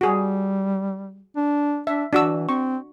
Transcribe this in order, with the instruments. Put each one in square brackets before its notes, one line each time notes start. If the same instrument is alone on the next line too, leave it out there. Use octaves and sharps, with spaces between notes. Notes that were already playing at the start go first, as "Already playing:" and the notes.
[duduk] G3 [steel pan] F#4 G#4
[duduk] D4
[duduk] D4 [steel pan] E5
[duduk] E3 [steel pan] D4 F#4 E6
[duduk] C4 [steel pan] C#6